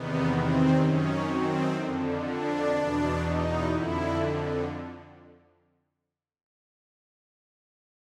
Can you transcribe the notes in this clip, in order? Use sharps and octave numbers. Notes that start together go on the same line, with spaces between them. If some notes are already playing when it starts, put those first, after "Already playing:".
Already playing: E2 C3 D#3 B3
C4
F#2 D#3 C#4
C4
F2 D3
D4
E2 B2
D#4
F2 D3 E4